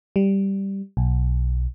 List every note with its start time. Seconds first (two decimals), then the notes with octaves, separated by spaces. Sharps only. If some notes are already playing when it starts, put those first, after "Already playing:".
0.16 G3
0.97 B1